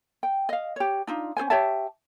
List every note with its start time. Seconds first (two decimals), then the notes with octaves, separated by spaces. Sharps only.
0.23 G5
0.49 D#5 F5
0.76 G4 C#5
1.07 D4 D#4 F4
1.37 C#4 G#4 C5 G#5
1.50 G4 C#5 E5 A5